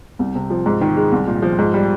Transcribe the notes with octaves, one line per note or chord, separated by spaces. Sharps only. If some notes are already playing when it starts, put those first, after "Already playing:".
C2
C3
F3
G#2
D#3
G#3
C2
A#2
F3
G#2
G3